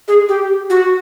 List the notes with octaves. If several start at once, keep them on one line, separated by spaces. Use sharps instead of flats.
G#4
G4
F#4